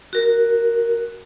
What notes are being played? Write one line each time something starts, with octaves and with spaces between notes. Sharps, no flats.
F#4 A#4